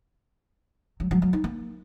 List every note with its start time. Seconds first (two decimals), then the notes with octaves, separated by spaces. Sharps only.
1.00 F#3
1.11 F#3
1.22 F#3
1.33 D#4
1.44 A#3